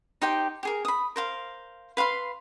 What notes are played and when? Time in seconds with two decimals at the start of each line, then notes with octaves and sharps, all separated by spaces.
0.22 D#4 G4 C5 G5
0.63 G4 G#4 A#4
0.85 B5 D#6
1.16 A#4 C5 F5
1.97 B4 F5 B5 C6